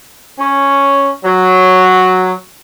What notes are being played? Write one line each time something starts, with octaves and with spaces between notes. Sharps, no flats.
C#4
F#3